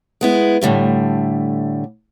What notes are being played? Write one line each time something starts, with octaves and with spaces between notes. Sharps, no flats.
G#3 B3 E4
A2 D3 G3 A3